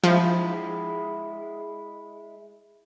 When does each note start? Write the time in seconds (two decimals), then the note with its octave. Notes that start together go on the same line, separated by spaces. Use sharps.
0.04 F3 G#3 E4